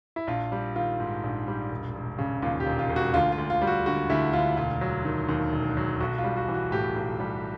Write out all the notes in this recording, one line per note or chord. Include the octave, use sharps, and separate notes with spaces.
E4
A#1 F4
G3
D#3 F4
G#2
A#1
G3
E1
E1
C#3
D#2 F4
G4
E1
F4
E1
F#4
D2 F4
F4
D2
F4
G3
F#4
D3 F#4
D2 E4
D2 F4
E1 F4
F#3
D#3
D#2
E1
F#3
B1 F#4
F4
G3
F#4
E3
F#4
A2 G4
B1
G3